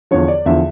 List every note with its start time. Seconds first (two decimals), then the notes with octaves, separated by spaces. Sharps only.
0.11 E2 D3 F3 C#5
0.28 D5
0.46 E2 D3 F3 E5